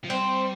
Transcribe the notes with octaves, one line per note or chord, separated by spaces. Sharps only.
F3
G3 C4